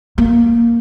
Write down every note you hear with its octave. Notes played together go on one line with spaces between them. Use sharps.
A#3